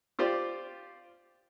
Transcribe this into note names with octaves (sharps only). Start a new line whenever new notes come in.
F4 G4 C5 D5